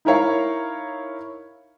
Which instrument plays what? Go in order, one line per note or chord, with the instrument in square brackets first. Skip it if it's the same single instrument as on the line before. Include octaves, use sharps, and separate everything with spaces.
[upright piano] D#4 E4 A#4 C#5 F5